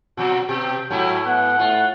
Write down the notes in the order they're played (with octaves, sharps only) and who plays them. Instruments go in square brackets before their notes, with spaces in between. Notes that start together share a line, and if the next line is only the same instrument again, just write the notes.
[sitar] B2 F#3 [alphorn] F#4
[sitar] B2 [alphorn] G4 [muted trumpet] G5
[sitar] G#2 A3 E4 [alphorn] F#3
[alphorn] B3 [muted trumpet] F#5
[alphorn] A2 [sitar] F4